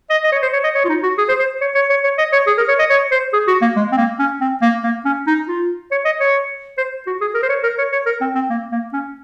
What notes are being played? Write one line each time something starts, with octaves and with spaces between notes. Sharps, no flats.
D#5
D#5
C#5
C5
C#5
D#5
C#5
F4
D#4
F#4
G#4
C5
C5
C#5
C#5
C#5
C#5
D#5
C#5
G#4
A#4
C#5
D#5
C#5
C5
G#4
F#4
A#3
G#3
C4
A#3
C#4
C4
A#3
A#3
C#4
D#4
F4
C#5
D#5
C#5
C5
F#4
G#4
A#4
C5
C#5
A#4
C#5
C#5
A#4
C4
C4
A#3
A#3
C#4